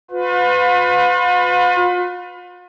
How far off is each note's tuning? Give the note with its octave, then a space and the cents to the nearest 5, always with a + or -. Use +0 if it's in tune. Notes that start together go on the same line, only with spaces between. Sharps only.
F4 +40 B4 +30